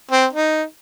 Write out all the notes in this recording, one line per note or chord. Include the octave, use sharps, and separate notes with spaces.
C4
D#4